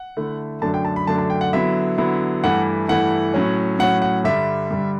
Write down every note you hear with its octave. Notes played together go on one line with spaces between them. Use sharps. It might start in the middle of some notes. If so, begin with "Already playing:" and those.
Already playing: F#5
D3 A3 E4
F#2 D3 F#3 A3 D4 A5
G5
A5
B5
F#2 D3 F#3 A3 D4 A5
A5
G5
F#5
D3 F#3 B3 E4 E5
D3 F#3 B3 E4
G2 E3 A3 E4 F#5
G2 E3 A3 E4 F#5
A2 F#3 C#4
A2 F#3 C#4 F#5
F#5
G2 D3 G3 E5
G2 D3 G3